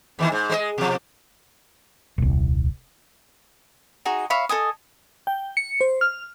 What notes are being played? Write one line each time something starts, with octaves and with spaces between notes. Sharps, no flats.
D#2 D#3 E3
G#2
G#3 A3 D#5
B2 F3
D#1 C2
D#4 F#4 G#4
C#5 E5 F5 B5
A4 D#5 G#5 D#6
G5
C#7
C5
F6